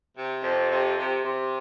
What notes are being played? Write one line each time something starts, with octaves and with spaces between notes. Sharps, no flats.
C3
F2
C3
C3
C3